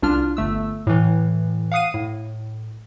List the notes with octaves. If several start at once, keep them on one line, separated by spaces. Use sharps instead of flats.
C2 D4 F4 F6
G1 A3 E6
A2 E3
F5 F#5 D#6 C7 D#7
A2